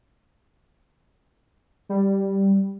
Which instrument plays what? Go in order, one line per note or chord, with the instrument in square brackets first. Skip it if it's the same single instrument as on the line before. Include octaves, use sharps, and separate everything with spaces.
[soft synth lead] G3